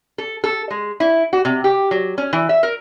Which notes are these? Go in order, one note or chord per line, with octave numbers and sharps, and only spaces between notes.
A4
A4
G#3
E4
F#4
C3
G4
F#3
C#4
E3
E5
A#4